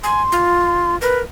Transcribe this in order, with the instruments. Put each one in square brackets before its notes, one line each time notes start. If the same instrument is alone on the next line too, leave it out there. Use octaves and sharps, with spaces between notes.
[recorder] G#5 [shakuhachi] C6
[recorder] F4
[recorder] A#4 [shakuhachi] B4